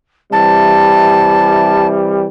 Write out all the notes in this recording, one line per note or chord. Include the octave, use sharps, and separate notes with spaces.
C3 E3 G3 A5